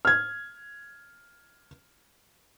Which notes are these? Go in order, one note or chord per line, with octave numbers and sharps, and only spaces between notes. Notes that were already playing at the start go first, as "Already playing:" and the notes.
F6 G#6